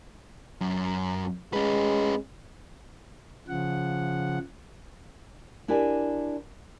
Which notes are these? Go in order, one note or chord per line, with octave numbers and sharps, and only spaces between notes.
F#2
G#3 C#4 B4
C#3 F3 F#5
D4 E4 G4 A#4 D5 G#5